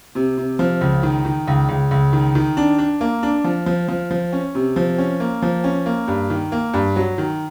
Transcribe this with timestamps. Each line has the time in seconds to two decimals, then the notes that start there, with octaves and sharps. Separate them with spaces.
0.15 C3
0.38 C3
0.59 F3
0.81 C#2
1.03 D#3
1.25 D#3
1.48 C#2
1.69 C#2
1.91 C#2
2.13 D#3
2.35 D#3
2.57 D4
2.79 D4
3.01 A#3
3.23 D4
3.44 F3
3.66 F3
3.88 F3
4.11 F3
4.33 C#4
4.55 C3
4.76 F3
4.98 C#4
5.20 A#3
5.42 F3
5.64 C#4
5.86 A#3
6.08 G2
6.30 D#3
6.52 A#3
6.74 G2
6.96 F#3
7.18 D#3